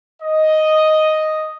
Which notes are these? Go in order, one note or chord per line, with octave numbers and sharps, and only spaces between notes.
D#5